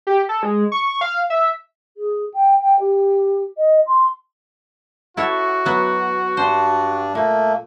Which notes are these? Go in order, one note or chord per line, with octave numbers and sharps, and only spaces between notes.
G4
A4
G#3
C#6
F5
E5
G#4
G5
G5
G4
D#5
C6
E4 F#4 A4 C#5
F#3 B3
G2 D4 C5
A#2 A3 A#3